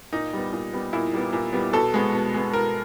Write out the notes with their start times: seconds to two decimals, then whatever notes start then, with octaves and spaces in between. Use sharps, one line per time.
0.13 A#2 D#4
0.33 G3 B3
0.52 A#2
0.73 G3 B3
0.93 A#2 E4
1.14 G3 B3
1.33 A#2
1.53 G3 B3
1.73 B2 A4
1.94 G#3 B3
2.13 B2
2.34 G#3 B3
2.53 B2 A#4